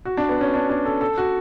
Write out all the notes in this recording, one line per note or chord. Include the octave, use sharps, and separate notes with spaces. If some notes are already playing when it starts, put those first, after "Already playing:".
F#4
D4
B3
C#4
D4
D4
A4
A4
F#4